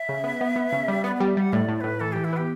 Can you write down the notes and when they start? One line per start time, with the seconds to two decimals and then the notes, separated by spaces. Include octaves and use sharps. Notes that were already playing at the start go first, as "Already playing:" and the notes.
Already playing: E5
0.09 C#3
0.24 B3
0.41 B3
0.56 B3
0.72 C#3
0.88 G3
1.04 B3 D5
1.16 G3 D5
1.28 E5
1.37 G3 F#5
1.53 A2 D5
1.68 A2
1.76 D5
1.81 A2 B4
2.00 E3 A4
2.12 E3 G4
2.24 E4
2.33 B3 G4